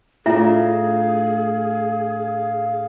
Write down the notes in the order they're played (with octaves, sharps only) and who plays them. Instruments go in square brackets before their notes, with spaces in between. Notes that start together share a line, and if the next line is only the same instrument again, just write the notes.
[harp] A2 D4 [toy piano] E4 F4 E5 [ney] G#4 [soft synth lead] F5